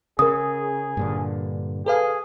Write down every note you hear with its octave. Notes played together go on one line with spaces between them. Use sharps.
C#3 G#4 A#4 D#6
G2 A#2 D3
G#4 A4 B4 F5